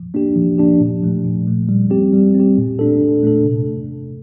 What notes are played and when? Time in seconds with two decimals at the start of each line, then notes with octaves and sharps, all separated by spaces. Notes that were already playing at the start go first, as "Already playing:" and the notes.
Already playing: F3
0.14 A#3 D4 G4
0.36 F3
0.58 A#3 D4 G4
0.80 A#2
1.02 F3 A3
1.24 A#2
1.47 F3 A3
1.69 G3
1.90 C4 G4
2.13 G3
2.35 C4
2.40 G4
2.57 A#2
2.79 A3 D4 A4
3.01 A#2
3.23 A3 D4 A4
3.45 C3